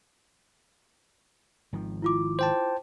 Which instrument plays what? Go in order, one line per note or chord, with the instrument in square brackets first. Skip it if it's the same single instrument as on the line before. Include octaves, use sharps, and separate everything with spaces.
[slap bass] G#1 D#3 F3
[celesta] E4 F4 D6
[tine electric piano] C5 G5 A5